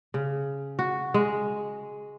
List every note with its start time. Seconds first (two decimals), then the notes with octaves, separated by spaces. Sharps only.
0.14 C#3
0.79 F#4
1.14 G#3